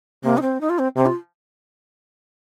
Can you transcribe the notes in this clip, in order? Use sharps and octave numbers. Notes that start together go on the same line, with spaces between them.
C3 A#3
D#4
C4
D#4
F4
C4
C3 C4
F4